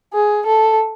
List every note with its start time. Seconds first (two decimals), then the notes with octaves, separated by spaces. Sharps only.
0.13 G#4
0.46 A4